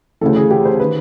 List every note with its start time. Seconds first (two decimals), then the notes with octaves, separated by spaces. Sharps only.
0.21 D2 C#3 E3 A4
0.36 G#4
0.51 G4
0.65 C5
0.80 D#3 B4